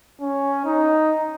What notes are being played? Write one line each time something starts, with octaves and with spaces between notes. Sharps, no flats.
C#4
D#4